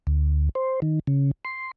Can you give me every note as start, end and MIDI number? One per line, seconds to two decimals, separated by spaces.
0.07 0.49 38
0.55 0.80 72
0.82 1.00 51
1.07 1.31 49
1.45 1.71 84